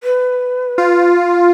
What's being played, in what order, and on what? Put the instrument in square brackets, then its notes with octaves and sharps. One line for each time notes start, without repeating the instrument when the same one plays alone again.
[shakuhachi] B4
[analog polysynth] F4